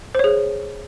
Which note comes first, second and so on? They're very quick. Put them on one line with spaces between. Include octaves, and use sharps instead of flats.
C5 C#5 G#4